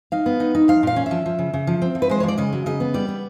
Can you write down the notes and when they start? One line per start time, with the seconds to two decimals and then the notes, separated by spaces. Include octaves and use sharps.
0.12 D#4 F5
0.26 B3
0.40 D#4
0.55 D#4
0.68 F3 F5
0.83 A#2 F5
0.96 C#4
1.06 E5
1.11 F3
1.26 F3
1.39 C#3
1.54 C#3
1.67 F3
1.82 C4
1.95 F3
2.02 B4
2.09 G#3 C5
2.20 C#5
2.23 F3
2.28 D5
2.38 C#3 D#5
2.53 F#3
2.66 C#3 D#5
2.80 B3
2.94 G3 D5
3.08 B3